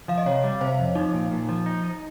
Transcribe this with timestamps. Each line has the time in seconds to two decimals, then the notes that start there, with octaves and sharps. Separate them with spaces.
0.08 F3 F5
0.18 D#5
0.26 C3 C#5
0.44 G3
0.61 C3 C5
0.79 F2
0.95 F3 D#4
1.13 A#2
1.31 A#2
1.49 F3
1.66 D#4
1.84 D#4